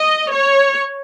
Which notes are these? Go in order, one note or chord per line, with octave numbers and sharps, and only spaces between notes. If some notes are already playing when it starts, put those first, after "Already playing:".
Already playing: D#5
C#5